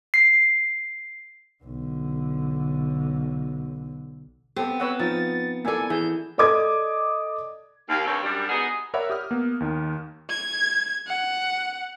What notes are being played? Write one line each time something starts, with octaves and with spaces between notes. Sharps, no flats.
C7
B1 D3
B3 C4 G4 A4
B4 C#5 F#5 E6
F3 D#4 A6
A#3 E4 A4 D5 G#5
E3 G#4 G6
A4 D5 D#5 D6 D#6 G#6
D#2 F5
G2 C3 G4 A4 A#4 C#5
F#2 G3 D4
B3 D#4 F#4 G#4
A#4 C#5 D5 E5 F#5 B5
G4 D#6 F6
A#3 B3
D#2 D#3
G#6
F#5